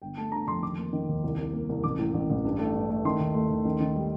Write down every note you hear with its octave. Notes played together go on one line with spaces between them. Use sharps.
G1 G5
A3 A5
D3 A#5
F2 C6
D#3 D6
A#3
D#3
D#2
C2
C2
A#3
C2
A1 D6
A2
A1
A1
G2
A3
G2
A3
D#3 C6
D#2
A3
D#2
D#3
D#3
G3